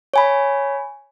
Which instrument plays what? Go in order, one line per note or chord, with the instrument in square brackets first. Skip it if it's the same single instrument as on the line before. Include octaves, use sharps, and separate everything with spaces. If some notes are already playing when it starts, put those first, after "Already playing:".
[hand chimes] C#5 G#5 B5